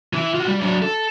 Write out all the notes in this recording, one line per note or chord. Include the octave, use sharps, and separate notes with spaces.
E3 E4
F4 F#4
G3
F#3 D4
A4